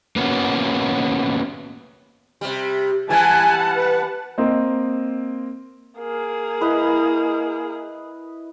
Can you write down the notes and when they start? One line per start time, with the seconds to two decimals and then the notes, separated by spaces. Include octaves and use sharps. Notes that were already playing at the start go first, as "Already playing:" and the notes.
0.16 A#3 B3 C#4 F#4
2.41 C3 G3
3.10 E3 G3 F#5 G#5 A5
3.77 B4
4.38 A#3 C4 D#5
5.99 A#3 G#4
6.61 E4 B4 D#5